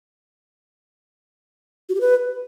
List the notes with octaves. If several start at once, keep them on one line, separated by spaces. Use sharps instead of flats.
F#4
G4
B4